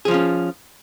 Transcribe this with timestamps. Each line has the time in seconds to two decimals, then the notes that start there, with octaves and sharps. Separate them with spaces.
0.05 G#4
0.08 F3
0.11 F4
0.14 C#4